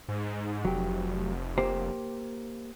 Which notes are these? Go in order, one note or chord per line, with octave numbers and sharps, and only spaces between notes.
G#2
F1 F#3 G4
A#3 G4 C5